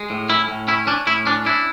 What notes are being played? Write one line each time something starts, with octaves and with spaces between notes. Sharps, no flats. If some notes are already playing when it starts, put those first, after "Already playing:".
Already playing: G#3
A2
C#4 E4
A2
C#4 E4
C#4 D4
A2 E4
C#4 D4
D4 E4